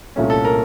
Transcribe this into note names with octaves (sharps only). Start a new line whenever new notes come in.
C2 A#2 A3 C#4
A4
A#4